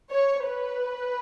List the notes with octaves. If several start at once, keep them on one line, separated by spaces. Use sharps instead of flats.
C#5
B4